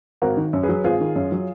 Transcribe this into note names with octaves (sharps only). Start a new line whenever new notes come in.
G#1 F#4 A#4
D#3
F#2
G#4 B4
F#3
G#1 F4 G#4
D#3
F#2
F#3